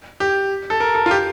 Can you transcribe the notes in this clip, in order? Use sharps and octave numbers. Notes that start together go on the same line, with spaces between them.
G4
A4
A#4
A4
F4
G4